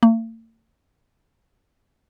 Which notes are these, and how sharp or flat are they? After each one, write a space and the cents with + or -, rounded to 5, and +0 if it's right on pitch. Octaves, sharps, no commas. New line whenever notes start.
A3 +45